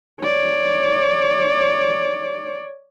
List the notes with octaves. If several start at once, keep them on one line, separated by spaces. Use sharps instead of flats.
C#5 D5